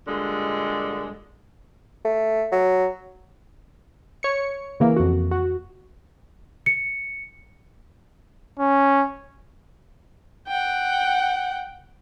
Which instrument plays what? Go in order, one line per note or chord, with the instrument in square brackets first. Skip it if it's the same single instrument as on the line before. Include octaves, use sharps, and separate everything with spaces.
[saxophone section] G2 A#2 D3 G#3
[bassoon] A3
F#3
[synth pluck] C#5 C#7
C#3 E3 A#3
F2 F#4
F#4
[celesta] C#7
[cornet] C#4
[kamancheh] F#5 G5